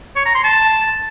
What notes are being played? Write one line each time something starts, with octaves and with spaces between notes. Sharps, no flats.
C#5
A#5
C6
A5